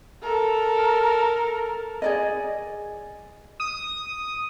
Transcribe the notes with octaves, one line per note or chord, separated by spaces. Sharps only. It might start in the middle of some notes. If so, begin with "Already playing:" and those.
A4 A#4
G#4 D5 D#5
D#6